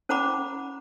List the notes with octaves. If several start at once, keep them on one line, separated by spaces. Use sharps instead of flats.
C#4 C5 F#5 A#5 B5 D6